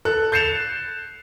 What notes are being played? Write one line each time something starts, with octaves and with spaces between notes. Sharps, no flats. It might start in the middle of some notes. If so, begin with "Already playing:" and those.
A4 F#6
G6 A6 C7 C#7 E7 F7